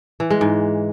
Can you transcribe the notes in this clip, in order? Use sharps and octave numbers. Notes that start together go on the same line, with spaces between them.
E3
G#3
G#2